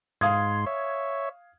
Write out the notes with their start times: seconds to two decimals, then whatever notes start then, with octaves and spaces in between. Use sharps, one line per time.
0.21 G#2 F5 C6 D#6 G#6
0.66 C#5 E5